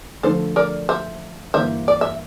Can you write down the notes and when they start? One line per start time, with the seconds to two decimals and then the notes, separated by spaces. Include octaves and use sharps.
0.23 D3 F3 A3 D4 A4 C5
0.56 A#4 D5
0.89 C5 E5
1.54 G2 E3 A#3 C5 E5
1.88 D5
2.01 E5